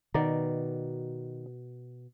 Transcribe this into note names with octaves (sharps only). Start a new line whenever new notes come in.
B2 D#3 D5 A#5